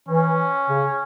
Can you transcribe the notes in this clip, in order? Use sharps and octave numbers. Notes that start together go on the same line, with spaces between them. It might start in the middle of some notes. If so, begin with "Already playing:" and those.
E3 C#4
C#3